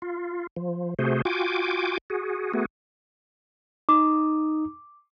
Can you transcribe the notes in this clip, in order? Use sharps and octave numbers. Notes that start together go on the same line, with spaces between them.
F4
F3
C3 A3 F#4 G#4 C5
F4 F#4 G5 G#5 D6
F#4 G#4
A3 B3 F#4 G#4
D#4 A#5 D6 D#6